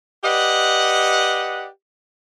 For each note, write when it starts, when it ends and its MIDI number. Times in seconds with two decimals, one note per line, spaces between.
0.24 1.67 67
0.24 1.67 71
0.24 1.67 74
0.24 1.67 75
0.24 1.67 78